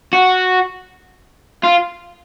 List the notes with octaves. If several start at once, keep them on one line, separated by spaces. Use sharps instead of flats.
F#4
F4